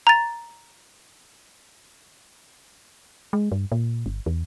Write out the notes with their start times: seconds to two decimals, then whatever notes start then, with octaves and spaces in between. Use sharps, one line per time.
0.07 A#5 A6
3.33 G#3
3.52 G2
3.72 A#2
4.06 G1
4.26 E2